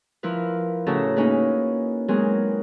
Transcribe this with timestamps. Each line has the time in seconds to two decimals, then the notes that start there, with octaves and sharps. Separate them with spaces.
0.23 F3 E4 A#4 B4
0.87 A2 C#3 C#4 F#4 A4 A#5
1.16 A#3 C#4 D#4 E4 G#4 B4
2.08 F#3 G#3 B3 C4 G#4 A#4